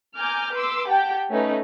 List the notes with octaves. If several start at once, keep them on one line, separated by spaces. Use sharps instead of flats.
G#5 A#5 D6 F6 G6
B4 C6 D6 E6
G4 F#5 G5 A5 G6
A3 C#4 D#4 B4